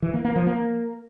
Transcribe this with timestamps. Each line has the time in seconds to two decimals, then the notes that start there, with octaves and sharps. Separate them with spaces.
0.02 E3
0.13 A#3
0.25 A#3
0.36 F3
0.47 A#3